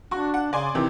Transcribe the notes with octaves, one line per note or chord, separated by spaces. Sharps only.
D4 F#4 C#6
F#5
C#3 D5 G#5 C6
C3 D#3 E3 C4